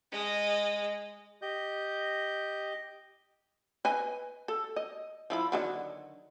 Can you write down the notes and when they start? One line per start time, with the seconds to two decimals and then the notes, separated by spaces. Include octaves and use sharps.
0.12 G#3 D#5
1.42 G4 D#5 G6
3.85 B4 D#5 G#5
4.48 A4
4.76 D#5
5.30 F3 E4 B5
5.52 D3 D#3 F#3